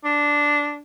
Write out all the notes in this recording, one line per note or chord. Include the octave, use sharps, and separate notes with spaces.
D4